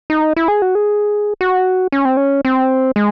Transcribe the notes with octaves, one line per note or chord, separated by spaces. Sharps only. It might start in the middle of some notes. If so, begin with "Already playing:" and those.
D#4
E4
G#4
F#4
G#4
F#4
C#4
C4
C#4
C4
G#3